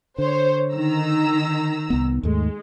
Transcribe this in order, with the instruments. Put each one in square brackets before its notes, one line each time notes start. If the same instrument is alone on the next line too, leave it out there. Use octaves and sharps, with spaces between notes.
[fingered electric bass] D3 [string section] C5 C#5
[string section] D#3 A#5 E6
[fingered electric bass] C2 B3
[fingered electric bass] D#2 G#2 A3 [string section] G#3